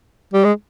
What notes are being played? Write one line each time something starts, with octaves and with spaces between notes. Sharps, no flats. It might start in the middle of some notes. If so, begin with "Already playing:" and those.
G3
G#3